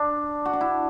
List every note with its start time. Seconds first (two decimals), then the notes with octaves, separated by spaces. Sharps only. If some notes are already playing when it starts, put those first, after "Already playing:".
Already playing: D4
0.45 F#4
0.53 D4
0.61 E4